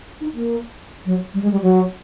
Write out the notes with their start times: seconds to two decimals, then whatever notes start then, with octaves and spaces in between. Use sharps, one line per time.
0.21 D#4
0.34 A#3
1.05 F#3
1.34 G3
1.42 G#3
1.52 G3
1.62 F#3